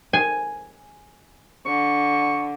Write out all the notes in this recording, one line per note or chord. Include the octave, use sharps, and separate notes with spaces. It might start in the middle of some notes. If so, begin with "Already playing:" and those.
G#5
D3 C#6